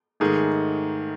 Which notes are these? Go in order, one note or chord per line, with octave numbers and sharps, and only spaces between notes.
G#2 D#3 A3 G#4